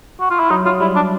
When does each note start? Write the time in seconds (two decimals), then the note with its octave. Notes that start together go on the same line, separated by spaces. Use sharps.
0.21 F#4
0.30 F4
0.40 E4
0.50 F#3 D#4
0.66 F#3 F4
0.80 G3 E4
0.96 D4